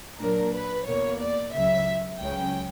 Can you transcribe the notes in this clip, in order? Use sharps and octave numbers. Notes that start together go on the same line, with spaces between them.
A#2 F#3 A#3 D4 A#4
B4
E2 B2 A#3 C#5
D5
C#2 C#3 F#3 E5
C#2 C#3 F#3 C#4 G5